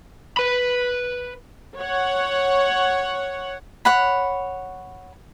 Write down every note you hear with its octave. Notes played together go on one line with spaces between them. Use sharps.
B4 B5
C#5 F#5
C#5 F#5 B5